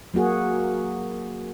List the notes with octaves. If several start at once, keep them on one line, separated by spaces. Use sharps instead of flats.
F#3 A#3 F#4 G#4